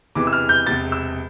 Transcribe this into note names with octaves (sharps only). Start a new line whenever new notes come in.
E1 E2 C3 E3 D6
E6
F6
G6
E1 E2 C3 A6
E6